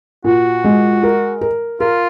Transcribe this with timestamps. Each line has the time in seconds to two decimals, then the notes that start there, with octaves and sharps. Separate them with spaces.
0.24 A#2 F#4
0.64 G#3
1.03 A#4
1.41 A#4
1.80 F4 A#4